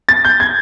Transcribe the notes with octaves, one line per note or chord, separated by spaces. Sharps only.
A6
G6
G#6